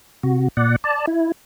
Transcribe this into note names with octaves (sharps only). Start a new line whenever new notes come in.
C3 F#4
A#2 D5 F#5
D5 A5
E4